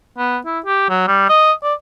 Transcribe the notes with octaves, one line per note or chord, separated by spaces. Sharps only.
B3
E4
G4
F#3
G3
D#5
D5